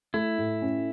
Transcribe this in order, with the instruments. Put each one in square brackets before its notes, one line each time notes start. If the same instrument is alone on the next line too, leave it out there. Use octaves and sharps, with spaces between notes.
[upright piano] A3 [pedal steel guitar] E4
[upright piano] A2
C#4